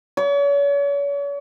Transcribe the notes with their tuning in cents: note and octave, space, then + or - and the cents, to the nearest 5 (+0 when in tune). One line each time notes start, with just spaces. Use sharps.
C#5 +40